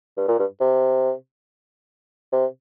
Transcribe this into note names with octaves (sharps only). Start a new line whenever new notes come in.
G2
A#2
G2
C3
C3